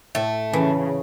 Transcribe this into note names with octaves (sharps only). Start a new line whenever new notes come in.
A2 A3
C#3 E3